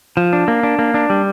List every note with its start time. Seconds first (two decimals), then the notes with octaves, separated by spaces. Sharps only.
0.17 F3
0.33 D4
0.48 A#3
0.63 D4
0.79 A#3
0.94 D4
1.10 G3